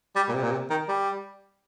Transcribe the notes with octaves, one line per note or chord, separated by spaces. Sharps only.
G3
A#2
C3
A#2
C3
D#3
G3